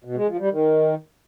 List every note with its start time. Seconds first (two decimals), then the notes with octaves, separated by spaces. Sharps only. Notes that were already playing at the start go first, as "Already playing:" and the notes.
0.05 B2
0.16 G#3
0.28 F3
0.40 G3
0.51 D#3